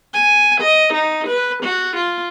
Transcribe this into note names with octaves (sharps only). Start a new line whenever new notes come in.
G#5
D#5
D#4
B4
F#4
F4